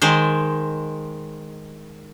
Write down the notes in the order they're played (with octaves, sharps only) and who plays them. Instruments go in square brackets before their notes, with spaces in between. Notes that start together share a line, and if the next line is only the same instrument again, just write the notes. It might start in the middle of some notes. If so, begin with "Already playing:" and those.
[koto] D#3 G#3 C5